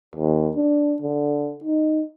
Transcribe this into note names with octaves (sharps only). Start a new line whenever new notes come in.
D#2
D4
D3
D#4